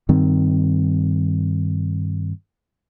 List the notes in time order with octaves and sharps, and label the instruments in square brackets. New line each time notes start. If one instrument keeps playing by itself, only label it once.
[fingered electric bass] G2 D#3 C4